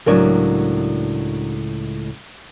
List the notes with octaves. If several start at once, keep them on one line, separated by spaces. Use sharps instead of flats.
C#2 A2 F#3 D4 A#4 C#5